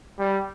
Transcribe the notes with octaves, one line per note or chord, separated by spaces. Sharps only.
G3